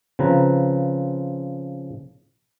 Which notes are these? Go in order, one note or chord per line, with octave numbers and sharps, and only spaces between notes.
C#3 F3 C4 B4 A#5